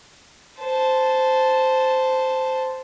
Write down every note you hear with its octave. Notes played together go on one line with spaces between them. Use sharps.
C5 A5